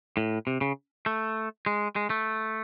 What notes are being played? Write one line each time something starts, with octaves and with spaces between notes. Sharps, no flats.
A2
C3
C#3
A3
G#3
G#3
A3